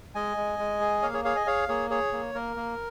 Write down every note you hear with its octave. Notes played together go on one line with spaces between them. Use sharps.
G#3 D#5 G#5
G#3
G#3
G#4
A#3 C#5 F5
G#4 C#5
G#4 C#5 F5
D#5 G#5
G#4 C#5 F5
A#3 G#4 C#5
G#4 C#5
A#3
A#3 A#4
A#3